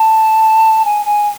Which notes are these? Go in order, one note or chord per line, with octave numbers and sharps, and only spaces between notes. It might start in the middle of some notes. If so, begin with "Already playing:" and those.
Already playing: A5
G#5
G#5